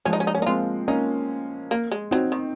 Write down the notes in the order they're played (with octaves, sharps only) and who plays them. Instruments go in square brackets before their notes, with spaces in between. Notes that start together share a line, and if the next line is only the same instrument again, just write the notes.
[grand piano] F3 G#3 [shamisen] C#4
[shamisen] D#4
C#4
D#4
C#4
[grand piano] A#3
[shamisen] D#4
[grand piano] G#3 C4 [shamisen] F4
[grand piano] A#3 C#4 [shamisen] D#4
[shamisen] A#3
G#3
[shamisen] F#3 [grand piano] C4 D#4
[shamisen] D#3